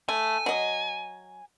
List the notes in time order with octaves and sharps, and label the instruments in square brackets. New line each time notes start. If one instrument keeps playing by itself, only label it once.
[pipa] A3 [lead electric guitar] G#5
[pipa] F#3 D#5